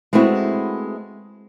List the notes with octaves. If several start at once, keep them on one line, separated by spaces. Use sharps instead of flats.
G#3 A3 B3 C4 E4 F#4